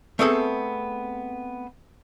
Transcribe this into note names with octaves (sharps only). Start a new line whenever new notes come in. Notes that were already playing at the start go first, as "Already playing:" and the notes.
A3 B3 C4 G#4 A4